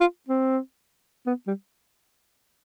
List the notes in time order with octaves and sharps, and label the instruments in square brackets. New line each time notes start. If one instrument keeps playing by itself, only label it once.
[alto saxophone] F4
C4
B3
G3